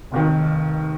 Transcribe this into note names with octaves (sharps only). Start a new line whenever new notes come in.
F1 D#2 D#3